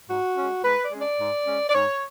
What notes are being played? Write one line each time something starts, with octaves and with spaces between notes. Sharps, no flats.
G#2 F#4
G#3 C#4
G#2 B4
D5
G#3 C#4
D5
G#2
G#3 C#4
D5
G#2 C#5